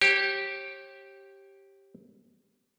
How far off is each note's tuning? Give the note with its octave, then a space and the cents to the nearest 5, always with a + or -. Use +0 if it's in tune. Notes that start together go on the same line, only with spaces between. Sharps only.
G4 -5 C#5 -40